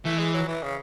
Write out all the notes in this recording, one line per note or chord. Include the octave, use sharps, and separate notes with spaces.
E3 A3
G#3
F#3
E3
C#3